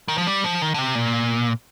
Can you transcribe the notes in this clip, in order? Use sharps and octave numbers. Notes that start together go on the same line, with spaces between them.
D#3
F3
G3
F3
D#3
D3
C3
A#2